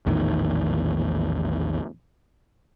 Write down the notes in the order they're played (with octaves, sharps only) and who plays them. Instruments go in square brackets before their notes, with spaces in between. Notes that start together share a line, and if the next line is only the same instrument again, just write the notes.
[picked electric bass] A#1 E2 A2 D#3